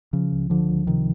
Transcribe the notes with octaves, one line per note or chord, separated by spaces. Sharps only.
C#3 F3
C#2
D3 F3
C#2
C3 D#3